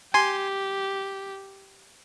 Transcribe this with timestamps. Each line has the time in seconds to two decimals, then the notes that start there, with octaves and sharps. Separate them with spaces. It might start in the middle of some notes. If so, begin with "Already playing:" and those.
0.14 G4 G#5 C6